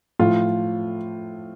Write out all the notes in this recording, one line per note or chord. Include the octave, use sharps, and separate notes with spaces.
A2 F3 F4